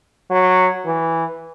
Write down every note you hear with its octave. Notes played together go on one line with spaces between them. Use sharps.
F#3
E3